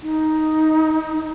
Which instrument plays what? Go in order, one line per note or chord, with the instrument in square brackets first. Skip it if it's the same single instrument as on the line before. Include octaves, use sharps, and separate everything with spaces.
[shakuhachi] D#4